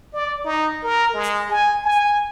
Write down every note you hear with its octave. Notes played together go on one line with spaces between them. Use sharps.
D5
D#4
A#4
G#3
G#5
G#5